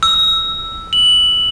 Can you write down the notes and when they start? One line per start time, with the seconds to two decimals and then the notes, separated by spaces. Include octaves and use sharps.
0.03 E6
0.93 F#7